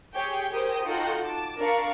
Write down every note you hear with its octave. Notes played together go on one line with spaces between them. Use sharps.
G4 G#4 C#5 G5
G4 G#4 A#4 C5 G5 D#6
D#4 F4 F#4 A4 F#5 G5
A5 D6
D4 A#4 D5 F5 C#6